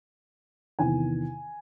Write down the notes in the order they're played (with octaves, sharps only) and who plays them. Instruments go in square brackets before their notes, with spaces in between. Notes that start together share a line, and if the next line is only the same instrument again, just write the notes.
[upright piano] E2 C3 D#3 G#5